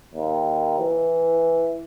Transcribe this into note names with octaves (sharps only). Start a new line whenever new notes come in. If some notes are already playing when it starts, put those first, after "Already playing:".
D#2
E3